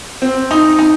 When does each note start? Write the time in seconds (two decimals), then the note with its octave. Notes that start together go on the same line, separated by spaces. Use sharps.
0.22 C4
0.51 D#4
0.79 D#4